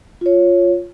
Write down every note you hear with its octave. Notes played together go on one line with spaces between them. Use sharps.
F4 C#5